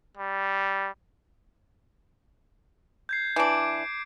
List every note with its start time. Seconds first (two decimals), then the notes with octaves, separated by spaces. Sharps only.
0.17 G3
3.09 G6 G#6 C7
3.36 E3 D4 D6 D7